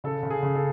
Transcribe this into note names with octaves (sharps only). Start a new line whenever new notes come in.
C#3 A4
C#3
G#4
C#3
A4